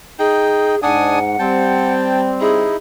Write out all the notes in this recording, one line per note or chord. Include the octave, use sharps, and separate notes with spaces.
D#4 G#4 G5
G#2 D4 F#5 G#5 D#6
G3 C4 G5 A5
D#4 E4 G#4